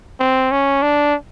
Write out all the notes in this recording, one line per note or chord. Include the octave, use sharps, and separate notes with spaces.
C4
C#4
D4